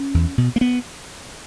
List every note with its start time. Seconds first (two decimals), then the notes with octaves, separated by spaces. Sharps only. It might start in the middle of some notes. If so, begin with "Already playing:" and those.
Already playing: C#4
0.14 E2
0.38 B2
0.56 A#3
0.61 B3